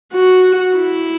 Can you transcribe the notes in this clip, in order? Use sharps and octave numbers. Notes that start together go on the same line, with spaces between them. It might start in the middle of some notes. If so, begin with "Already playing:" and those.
F#4
E4